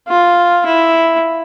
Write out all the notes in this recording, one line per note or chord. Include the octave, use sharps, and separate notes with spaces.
F4
E4